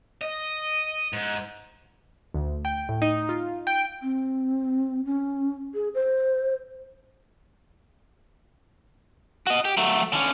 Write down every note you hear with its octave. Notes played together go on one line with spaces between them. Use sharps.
D#5
G#2
D2
G5
A2
D#4
F4
G5
C4
C#4
G#4
C5
F#4 D#5
G4
F#3 A3
D3 C#4